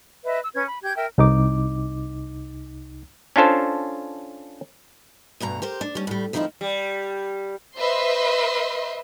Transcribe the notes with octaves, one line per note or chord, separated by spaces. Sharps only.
B4 D#5 E5
E6
C#4 B4 G#6
B5
G4 G6 G#6
A#4 E5 G5
C2 D#4 D6
C#4 D4 F4 A4 C5
D2 G2 B2 A#5
G4 A#4 C5
D4
G3 C#4
A2 G3
D2 D#3 F3 C4 D#4 E4
G3
B4 C5 D#5 E5 C6